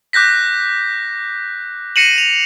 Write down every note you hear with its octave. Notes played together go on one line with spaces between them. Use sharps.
D6 F#6 G6 A#6 B6
A#6 C7 C#7 D#7 E7 F#7
F7